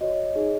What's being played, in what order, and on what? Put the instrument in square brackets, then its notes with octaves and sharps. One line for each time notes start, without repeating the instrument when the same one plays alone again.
[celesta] F#4 C#5 D#5
D#4 G#4 C#5